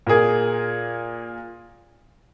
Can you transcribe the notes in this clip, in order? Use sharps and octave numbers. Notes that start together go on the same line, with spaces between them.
A#2 A#3 G#4